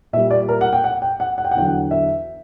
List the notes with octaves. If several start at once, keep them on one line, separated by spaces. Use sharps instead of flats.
A#2 G3 E5
D5
A#4
F#5
G5
F#5
G5
F#5
F#5
G5
F#5
E2 D3 F#3 G5
F#5
E5